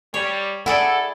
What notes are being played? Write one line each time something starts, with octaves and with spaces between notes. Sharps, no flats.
G3 C#5
E4 G#4 A4 D5 F#5